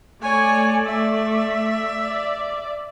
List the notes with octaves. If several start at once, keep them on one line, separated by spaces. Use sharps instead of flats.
A3 C#5 D5 G#5
E5
D5